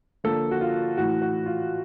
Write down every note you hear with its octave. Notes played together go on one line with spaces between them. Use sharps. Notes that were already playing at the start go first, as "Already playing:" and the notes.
D3 F3 A#3 A4
F#4
F4
A2 E3 A3 F#4
F#4
F4